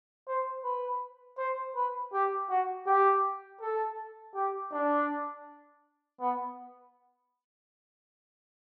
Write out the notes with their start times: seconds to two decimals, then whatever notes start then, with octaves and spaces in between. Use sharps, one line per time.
0.28 C5
0.64 B4
1.38 C5
1.75 B4
2.13 G4
2.50 F#4
2.87 G4
3.61 A4
4.35 G4
4.72 D4
6.21 B3